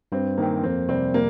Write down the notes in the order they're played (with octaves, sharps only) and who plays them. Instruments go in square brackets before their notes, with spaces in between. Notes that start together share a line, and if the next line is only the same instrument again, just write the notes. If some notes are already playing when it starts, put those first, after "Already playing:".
[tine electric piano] G2 [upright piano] C4
[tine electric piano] D#3 C4 [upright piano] A#3
[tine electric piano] F2 [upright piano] C4
[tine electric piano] C3 G3 [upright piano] C4
[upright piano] A#3